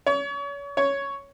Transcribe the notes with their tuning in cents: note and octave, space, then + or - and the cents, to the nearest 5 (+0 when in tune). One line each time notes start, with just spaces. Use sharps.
C#5 +35
C#5 +5